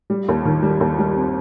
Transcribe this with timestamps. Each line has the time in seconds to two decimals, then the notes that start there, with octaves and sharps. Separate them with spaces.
0.10 G3
0.28 D#2
0.45 D#3
0.63 G3
0.80 D#2
0.99 G3
1.16 C4